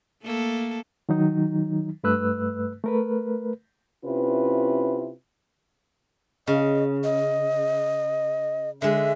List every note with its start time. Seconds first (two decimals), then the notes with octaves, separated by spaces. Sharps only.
0.23 A3 A#3 A4
1.09 D#3 F#3 D#4
2.04 G2 A3 B4 E6 F#6
2.84 A3 A#4 B4
4.04 C3 C#4 E4 F4 B4
6.47 C#3 D#5
7.04 D#5
8.82 D3 G#3 E5